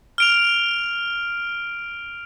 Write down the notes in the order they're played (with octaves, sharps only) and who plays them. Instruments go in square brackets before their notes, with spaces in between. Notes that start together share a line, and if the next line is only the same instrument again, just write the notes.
[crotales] F6 D7 F7